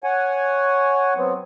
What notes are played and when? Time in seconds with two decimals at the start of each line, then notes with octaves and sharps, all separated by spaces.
0.04 C#5 F#5 G#5
1.17 F#3 B3 C4